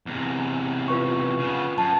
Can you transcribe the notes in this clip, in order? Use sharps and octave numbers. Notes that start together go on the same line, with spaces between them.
E2 C3
F4 B4 C#6
C#3 B3
F#2 A5